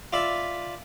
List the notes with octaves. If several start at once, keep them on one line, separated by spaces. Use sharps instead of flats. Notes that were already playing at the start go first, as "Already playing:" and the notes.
F4 D5 E5 B5